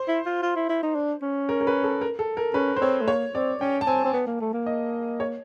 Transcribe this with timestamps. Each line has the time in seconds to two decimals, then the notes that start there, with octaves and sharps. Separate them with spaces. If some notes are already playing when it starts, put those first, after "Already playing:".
Already playing: C5
0.08 E4
0.26 F4
0.43 F4
0.56 E4
0.69 E4
0.83 D#4
0.95 D4
1.22 C#4
1.49 A#4
1.61 A#4
1.67 B4
1.84 A4
2.01 A#4
2.19 A4
2.37 A#4
2.54 C#4 B4
2.76 C5
2.81 C4 C#5
3.01 A3
3.08 A#3 C#5
3.35 C4 D5
3.61 C#4 G5
3.81 A5
3.87 C4 G#5
4.04 C4
4.13 B3
4.27 A#3
4.41 A3
4.54 A#3
4.66 D#5
5.20 C#5